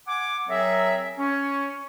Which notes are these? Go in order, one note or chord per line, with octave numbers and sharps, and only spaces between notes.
F#5 G#5 D6
F#3 C4 G#4 A#4 E5
C#4